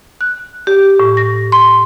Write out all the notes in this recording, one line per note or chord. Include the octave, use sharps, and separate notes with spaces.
F#6
G4
A2
A#6
C6